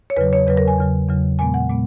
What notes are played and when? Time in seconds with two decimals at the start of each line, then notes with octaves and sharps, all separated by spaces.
0.10 C#5
0.16 E2 C#3 F#3 B4
0.33 C#5
0.47 E2 C#3 F#3 B4
0.57 A#4
0.67 G#5
0.79 E2 C#3 F#3
1.09 E2 C#3 F#3
1.39 A#2 G#3 B3 G#5
1.54 F#5
1.70 A#2 G#3 B3